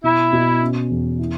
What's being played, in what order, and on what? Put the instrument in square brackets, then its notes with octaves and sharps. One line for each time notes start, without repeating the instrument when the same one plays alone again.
[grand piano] B2 [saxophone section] E4
[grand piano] B2
C#4
E2
E4